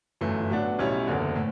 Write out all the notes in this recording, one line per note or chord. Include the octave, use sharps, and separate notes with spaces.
G1 F#2 E3 A3
A2 F#3 B3 D4
B1 A2 G3 C#4 E4
F#1 E2 D3
A2